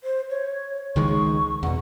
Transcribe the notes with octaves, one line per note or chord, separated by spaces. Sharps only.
C5
C#5
C#2 D#3 G#3 C#6
E2 B2 F#5